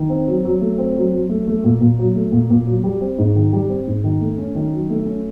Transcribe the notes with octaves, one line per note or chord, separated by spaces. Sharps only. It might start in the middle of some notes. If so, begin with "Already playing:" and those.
Already playing: D#3
C4
F#3
F#3
A3
C4
F#3
F#3
A3
A3
A#2
A#2
F#3
A3
A#2
A#2
F#3
G3
C4
G#2
D#3
G3
C4
G#2
D#3
A3
C#4
D#3
F#3
A3
C#4